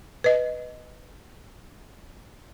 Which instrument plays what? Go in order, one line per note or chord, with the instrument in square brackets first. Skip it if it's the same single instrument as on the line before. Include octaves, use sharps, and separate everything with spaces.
[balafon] B4 D#5